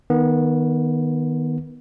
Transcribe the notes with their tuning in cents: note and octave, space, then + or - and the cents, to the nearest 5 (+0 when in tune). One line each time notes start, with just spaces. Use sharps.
D#3 +0 B3 -20